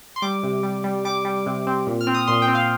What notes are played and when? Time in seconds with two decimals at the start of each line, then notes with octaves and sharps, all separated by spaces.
0.16 C6
0.22 G3 D6
0.43 C3
0.63 G3
0.84 G3
1.05 G3 D6
1.25 G3
1.46 C3
1.67 C4
1.87 A#2
2.01 F6
2.07 C4
2.14 D#6
2.27 A#2 C6
2.42 G5
2.48 C4
2.55 F5